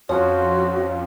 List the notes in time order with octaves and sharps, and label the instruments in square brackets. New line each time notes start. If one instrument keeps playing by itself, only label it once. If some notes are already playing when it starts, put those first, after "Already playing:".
[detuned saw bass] F2 [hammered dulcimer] F3 C#4 C5 [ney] F#4 [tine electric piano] C#5